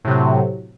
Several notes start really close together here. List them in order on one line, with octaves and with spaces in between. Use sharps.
A2 C3 F#3